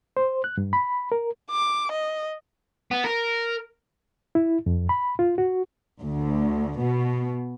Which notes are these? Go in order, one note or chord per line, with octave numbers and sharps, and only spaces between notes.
C5
F#6
G2
B5
A#4
D6
D#5
B3
A#4
E4
F2
B5
F4
F#4
D2
B2